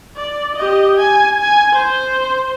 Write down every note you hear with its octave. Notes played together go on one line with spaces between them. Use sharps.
D5
G4 D#5
G#5
G#5
C5